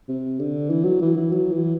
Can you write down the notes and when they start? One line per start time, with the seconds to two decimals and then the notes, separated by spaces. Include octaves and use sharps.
0.09 C3
0.39 D3
0.69 E3
0.85 F#3
1.01 E3
1.17 E3
1.32 F#3
1.52 E3